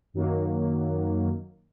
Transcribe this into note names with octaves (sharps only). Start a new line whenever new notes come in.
F#2 D#3 F#3 A#3